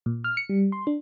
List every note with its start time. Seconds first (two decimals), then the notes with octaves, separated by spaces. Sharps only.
0.06 A#2
0.24 F6
0.37 C#7
0.49 G3
0.72 C6
0.87 D4